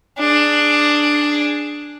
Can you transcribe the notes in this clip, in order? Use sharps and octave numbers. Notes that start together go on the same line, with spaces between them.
D4 G#4